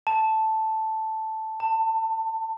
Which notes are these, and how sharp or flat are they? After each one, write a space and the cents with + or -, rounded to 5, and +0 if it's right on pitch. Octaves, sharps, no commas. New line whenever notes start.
A5 +0
A5 +25